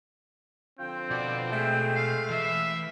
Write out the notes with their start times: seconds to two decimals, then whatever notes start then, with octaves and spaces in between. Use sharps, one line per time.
0.79 D3 F3 C4 F4 G5
1.10 B2 F#4 D5
1.51 G#3 A3 G5
1.96 F5
2.30 E3 E5